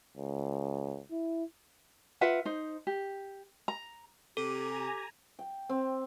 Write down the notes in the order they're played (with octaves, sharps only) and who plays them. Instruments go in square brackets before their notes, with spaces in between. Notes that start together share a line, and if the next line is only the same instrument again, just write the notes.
[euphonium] C#2
E4
[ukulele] F4 B4 E5 F#5
D#4 C5
G4
A#5
[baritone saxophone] C3 [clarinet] G4 [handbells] A4 [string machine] G#5 A#5
[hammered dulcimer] G5
C4